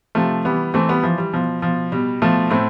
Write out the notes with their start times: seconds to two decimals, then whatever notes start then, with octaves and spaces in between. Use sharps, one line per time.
0.15 C3 F3 A3
0.45 E3 G3 B3
0.74 E3 A3 C4
0.89 G3 B3
1.03 E3 F3
1.18 G3
1.33 B2 F3
1.62 B2 F3
1.92 B2 G3
2.22 B2 F3 A3
2.50 A2 A3 C4